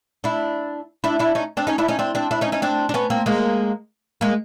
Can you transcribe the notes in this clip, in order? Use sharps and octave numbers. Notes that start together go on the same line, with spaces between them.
D4 E4
D4 E4
D4 E4
C#4 D#4
C4 D4
C#4 D#4
D4 E4
C#4 D#4
C4 D4
C4 D4
D4 E4
C#4 D#4
C#4 D#4
C4 D4
D4
B3 C#4
A#3 C4
G#3 A#3
G#3 A#3